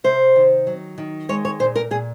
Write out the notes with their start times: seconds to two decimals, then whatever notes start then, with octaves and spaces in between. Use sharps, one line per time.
0.04 C3 C5
0.36 D#3
0.67 F#3
0.98 D#3
1.29 G#3 C#5
1.45 C#5
1.60 A#2 C5
1.76 A#4
1.91 A#2 G#4